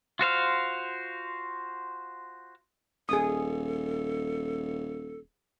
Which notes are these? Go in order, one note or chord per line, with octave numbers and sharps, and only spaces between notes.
F4 F#4 C5 F5
D#1 G#4 A4 D#6